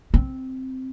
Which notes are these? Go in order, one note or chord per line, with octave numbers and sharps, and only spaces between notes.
C4